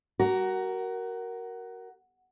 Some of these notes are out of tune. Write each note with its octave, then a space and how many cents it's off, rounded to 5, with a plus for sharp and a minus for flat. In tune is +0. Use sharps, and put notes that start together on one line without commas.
F#4 +20 A#4 +0